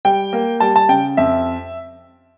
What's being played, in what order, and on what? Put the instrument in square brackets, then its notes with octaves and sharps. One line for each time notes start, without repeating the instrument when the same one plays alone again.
[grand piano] G3 G5
A#3
G3 A5
A5
C#3 G5
F2 E5